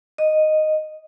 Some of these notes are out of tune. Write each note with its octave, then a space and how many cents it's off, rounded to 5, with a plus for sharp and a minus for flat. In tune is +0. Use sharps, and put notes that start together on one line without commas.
D#5 -5